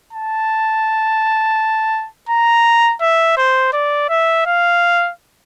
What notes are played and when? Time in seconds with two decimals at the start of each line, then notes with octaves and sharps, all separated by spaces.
0.13 A5
2.29 A#5
3.01 E5
3.37 C5
3.73 D5
4.09 E5
4.46 F5